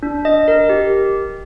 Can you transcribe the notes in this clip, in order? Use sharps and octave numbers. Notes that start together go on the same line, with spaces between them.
D4
D#5
A#4
G4